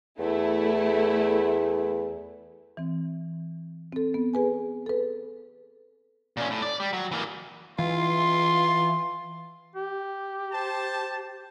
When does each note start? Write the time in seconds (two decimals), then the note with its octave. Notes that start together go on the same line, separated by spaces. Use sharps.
0.19 E2 A3 E4
2.77 E3 C4
3.93 C4 A4
4.14 B3
4.34 G#4 B4 G#5
4.86 A4 B4
6.37 A#2 C#4
6.50 A2
6.62 D5
6.80 G3
6.93 F#3
7.12 E3 A#3
7.79 E3 F4 C6
9.75 G4
10.52 C5 A5